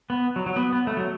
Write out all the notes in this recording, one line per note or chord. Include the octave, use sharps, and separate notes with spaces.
B3
F#3
F#3
B3
B3
A3
F#3